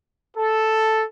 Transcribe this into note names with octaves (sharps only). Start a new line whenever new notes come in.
A4